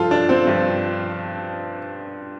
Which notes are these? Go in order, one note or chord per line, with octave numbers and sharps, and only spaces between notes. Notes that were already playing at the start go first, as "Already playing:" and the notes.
Already playing: G2 F3 F4 A4
D4
C4
G2 F3